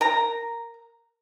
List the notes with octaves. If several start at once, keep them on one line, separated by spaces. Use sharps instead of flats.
A#4 A#5